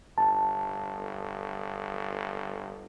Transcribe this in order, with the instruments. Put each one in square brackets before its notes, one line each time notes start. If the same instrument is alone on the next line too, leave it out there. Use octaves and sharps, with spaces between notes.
[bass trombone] G1 [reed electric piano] A5